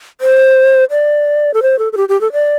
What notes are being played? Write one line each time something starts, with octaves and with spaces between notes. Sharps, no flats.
C5
D5
A4
C5
A4
A4
G4
G4
A4
D5